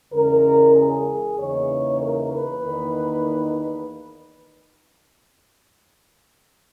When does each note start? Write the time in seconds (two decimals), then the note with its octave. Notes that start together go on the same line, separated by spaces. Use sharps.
0.13 E2 C#3 G#3 C#4 A#4
0.75 G#4
1.38 E2 C#3 E3 A#3 D#4 C#5
2.01 A#4
2.32 B4
2.64 E2 D#3 A#3 D#4